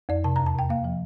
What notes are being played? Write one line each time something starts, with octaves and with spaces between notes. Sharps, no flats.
F2 D5
C3 A5
E2 A#5
A5
C3 G5
A#3 F5
F3